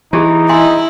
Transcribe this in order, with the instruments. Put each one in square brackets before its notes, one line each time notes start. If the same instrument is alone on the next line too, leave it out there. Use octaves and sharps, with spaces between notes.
[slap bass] E3 [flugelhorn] D#4 [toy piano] G4 G#4
[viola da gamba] E4 [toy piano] D#5 G#5 C6